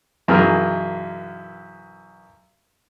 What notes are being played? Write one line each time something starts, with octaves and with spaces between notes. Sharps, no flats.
B1 F#2 E3 G#4 A#4 F6